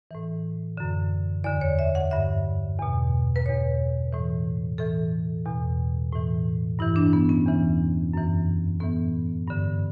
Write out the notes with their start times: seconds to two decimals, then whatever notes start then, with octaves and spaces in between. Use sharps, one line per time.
0.11 A2 E3
0.77 F#2 D3
1.44 E2 D3 D5
1.61 C#5
1.79 E5
1.95 F#5
2.11 G2 D3 E5
2.79 E2 B2
3.36 B4
3.45 E2 B2 C#5
4.13 A2 E3
4.78 A2 E3 A4
5.45 E2 B2
6.12 A2 E3
6.79 G2 E3 E4
6.96 D4
7.13 B3
7.29 C#4
7.46 E2 C#3 E3
8.13 F#2 E3
8.80 A2 E3 B3
9.47 G2 D3